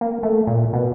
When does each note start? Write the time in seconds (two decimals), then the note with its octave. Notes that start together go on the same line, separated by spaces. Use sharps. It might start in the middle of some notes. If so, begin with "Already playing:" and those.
0.01 A#3
0.23 A3
0.47 A#2
0.73 B2